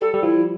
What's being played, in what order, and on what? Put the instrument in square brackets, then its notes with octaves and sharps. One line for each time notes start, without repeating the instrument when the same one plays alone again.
[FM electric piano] G3 [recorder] A4
[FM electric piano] G3
[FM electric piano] F3 [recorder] E4